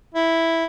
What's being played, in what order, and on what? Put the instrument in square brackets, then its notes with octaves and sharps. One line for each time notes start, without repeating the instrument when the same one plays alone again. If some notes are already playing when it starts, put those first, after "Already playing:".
[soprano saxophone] E4